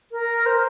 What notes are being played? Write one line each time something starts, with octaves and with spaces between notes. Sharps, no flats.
A#4
C5